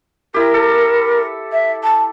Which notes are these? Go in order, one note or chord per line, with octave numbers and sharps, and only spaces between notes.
E4 G4 A#4
A4
E5
A5